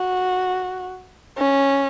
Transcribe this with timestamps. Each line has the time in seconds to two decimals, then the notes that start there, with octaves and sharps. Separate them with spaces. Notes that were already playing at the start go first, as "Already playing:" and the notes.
Already playing: F#4
1.38 C#4